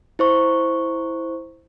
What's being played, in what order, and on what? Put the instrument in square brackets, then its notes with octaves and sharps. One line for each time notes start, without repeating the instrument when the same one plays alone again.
[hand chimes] E4 C5 C#6